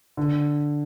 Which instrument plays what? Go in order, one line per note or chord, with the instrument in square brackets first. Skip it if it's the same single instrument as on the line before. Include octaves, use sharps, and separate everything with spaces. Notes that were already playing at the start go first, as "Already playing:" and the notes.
[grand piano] D3